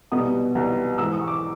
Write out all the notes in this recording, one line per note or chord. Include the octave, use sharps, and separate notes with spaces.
C2 B2 G3 B3 D#4 D#6
C2 B2 G3 B3 D#4
G#2 E3 G#3 E6
D#6
C#6
D6